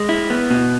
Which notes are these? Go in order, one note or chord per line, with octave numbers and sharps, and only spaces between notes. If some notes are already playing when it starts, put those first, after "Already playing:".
Already playing: G#3
E4
B3
B2